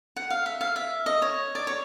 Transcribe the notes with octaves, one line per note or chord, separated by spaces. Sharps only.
F#5
F5
E5
F5
E5
D#5
C#5
D5
C#5